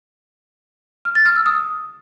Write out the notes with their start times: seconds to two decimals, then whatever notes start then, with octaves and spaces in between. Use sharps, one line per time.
1.05 F6
1.15 A6
1.26 F6
1.36 E6
1.46 D#6